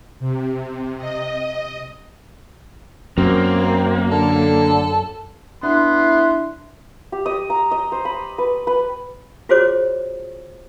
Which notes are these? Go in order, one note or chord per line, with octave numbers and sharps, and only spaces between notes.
C3
D#5
F#2 A#3 C4
D3 A4
B3 D4 E4 E5 C6
G4
D#5
A#5
D#5
C5
B5
B4
B4
F4 F#4 G#4 C5 C#5 D6